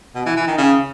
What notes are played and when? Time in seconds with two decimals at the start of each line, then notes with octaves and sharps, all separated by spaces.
0.15 B2
0.26 E3
0.36 E3
0.47 D#3
0.58 C#3